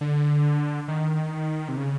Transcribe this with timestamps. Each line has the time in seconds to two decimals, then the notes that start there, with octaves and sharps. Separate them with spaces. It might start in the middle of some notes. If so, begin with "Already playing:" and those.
0.01 D3
0.88 D#3
1.68 C3
1.77 C#3